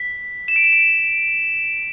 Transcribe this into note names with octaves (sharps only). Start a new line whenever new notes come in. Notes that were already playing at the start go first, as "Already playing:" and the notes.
Already playing: B6
E7
D7
E7
D7
E7